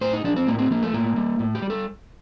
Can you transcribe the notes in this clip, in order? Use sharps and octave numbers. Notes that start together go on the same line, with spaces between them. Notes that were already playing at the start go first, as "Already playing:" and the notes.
A2 C5
D#4
F3 D4
C4
A2 A#3
C4
F3 A#3
A3
A2 A#3
G3
A2
G4
G3
A4